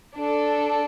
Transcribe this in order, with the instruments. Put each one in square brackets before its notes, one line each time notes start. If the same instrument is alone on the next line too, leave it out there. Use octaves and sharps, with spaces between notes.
[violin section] D4 A4